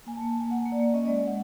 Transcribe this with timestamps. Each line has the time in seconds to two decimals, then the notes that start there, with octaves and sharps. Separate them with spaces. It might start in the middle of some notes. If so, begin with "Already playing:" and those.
0.07 A#3 G#5
0.17 A5
0.21 A#3
0.29 A5
0.36 A#3 G#5
0.50 A#3 F#5
0.65 A#3
0.72 D5
0.80 A#3
0.94 C#4 D#5
1.05 G#3 D5
1.15 D#5
1.23 G#3 F#5